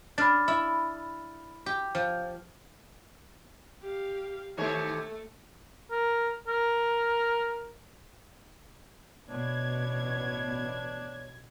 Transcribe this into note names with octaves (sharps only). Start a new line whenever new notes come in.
D4 B5 F6 A6
E4
G4
F3
G4 F5
C3 D#3 A3 C#5
A#4
A#4
A1 B2 D4 C#5 G#6